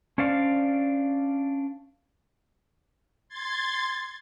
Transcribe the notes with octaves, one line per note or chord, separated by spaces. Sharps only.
C#4 D4 C5 D5 F5
C6 G#6 A6